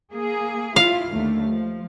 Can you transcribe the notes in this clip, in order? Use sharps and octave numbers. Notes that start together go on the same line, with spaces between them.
A#3 G#4
E4 F4 F5
D#2 D3 A3
F3